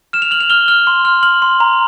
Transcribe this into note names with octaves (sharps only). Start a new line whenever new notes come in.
F6 E7
F7
F6 F#7
F7
F6 G7
F6
C6
F6
F6 F#7
C6
A#5